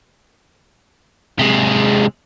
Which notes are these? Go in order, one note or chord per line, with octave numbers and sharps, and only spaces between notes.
C3 G#3